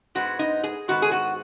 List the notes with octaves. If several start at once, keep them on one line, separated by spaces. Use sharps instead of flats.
G#2 G#3 B3 F#4
D#4
G#4
G#2 D#3 B3 F#4
G#4
F#4